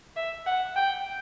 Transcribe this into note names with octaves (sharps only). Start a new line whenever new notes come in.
E5
F#5
G5